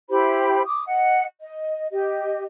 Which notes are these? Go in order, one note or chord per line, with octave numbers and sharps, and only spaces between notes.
E4 G4 C5 B5
D6 D#6
D#5 F#5
D#5
G4 D#5